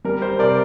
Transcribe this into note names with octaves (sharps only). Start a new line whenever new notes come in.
G3 A#4
C5
C3 A#4 D5